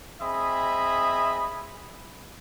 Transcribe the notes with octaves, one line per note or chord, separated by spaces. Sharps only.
C4 G#4 D#5 E5 B5 D#6